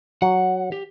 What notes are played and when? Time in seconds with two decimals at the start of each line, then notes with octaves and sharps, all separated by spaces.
0.22 F#3 F#5
0.72 G4